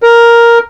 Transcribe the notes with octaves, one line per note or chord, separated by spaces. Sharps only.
A#4